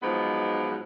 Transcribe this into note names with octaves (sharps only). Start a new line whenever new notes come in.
G#2 F3 F#3 B3 D#4